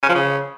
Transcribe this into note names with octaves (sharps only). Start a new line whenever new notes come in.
C#4
F3
C#3